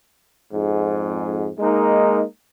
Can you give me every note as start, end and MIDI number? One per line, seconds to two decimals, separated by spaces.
0.52 1.49 41
0.52 1.49 44
1.59 2.23 56
1.59 2.23 58
1.59 2.23 63